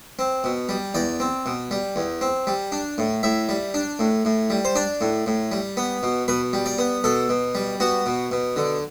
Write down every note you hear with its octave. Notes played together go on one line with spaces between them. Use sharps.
C4
B2
G3
E2 D5
C4
B2
G3
E2
C4
G3
D4
A2
A2 E5
G3
D4
A2
A2
G3
C5
D4 D5
A2
A2
G3
B3
B2
B2 B4
G3
D5
B3
B2 A4
B2
G3
B3 F#4
B2
B2
D3